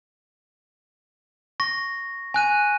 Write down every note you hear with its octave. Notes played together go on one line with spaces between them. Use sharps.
C#6 A#6
G#5 F#6 D#7